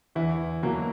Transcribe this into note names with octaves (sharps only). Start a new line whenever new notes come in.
E2 E3 E4
B2 F#3 A#3